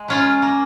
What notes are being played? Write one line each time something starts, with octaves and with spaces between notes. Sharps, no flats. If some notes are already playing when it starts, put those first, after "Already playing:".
Already playing: G#3
F#3 C#4 F4
A#3